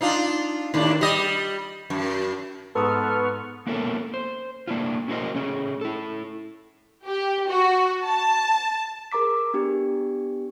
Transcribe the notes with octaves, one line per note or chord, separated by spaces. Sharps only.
D4 D#4 F4
D#2 A2 D4
G3 D#5
F#2
G#2 B3 A4 B4 C#6 D#6 F6
A#3 B3 C#4 E4 A4 A#4
C5
A3 A#3 D4 E4 F4
C#4 E4 F#4 A#4 C5 D#5
A3 C#4 G#4
E4 A4
G4
F#4
A5
G#4 A#4 A#5 D6 B6
B3 D4 G4